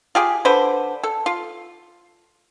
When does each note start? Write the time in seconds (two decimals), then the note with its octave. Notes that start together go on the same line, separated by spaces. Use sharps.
0.15 F4 G4 G#4
0.45 D3 B4 C5
1.04 A4
1.26 F4